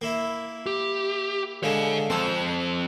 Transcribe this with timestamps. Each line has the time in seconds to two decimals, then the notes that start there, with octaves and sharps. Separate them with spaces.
0.01 A#3 E4
0.66 G4
1.63 D3 G#3 C#5 F5
2.10 F2 C4 A4